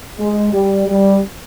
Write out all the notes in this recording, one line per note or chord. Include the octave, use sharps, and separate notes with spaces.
G#3
G3
G3